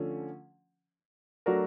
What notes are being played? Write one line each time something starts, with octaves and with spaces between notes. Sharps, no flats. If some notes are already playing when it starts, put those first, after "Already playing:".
Already playing: D3 F3 A3 C#4
F#3 A3 D4 F#4 A#4